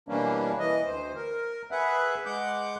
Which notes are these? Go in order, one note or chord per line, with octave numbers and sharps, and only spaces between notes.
B2 E3 G3 A#3 C#4 D4
E3 D#5
D2 C5
A#4
G#4 B4 E5 F#5
G#3 F#5 D6 G6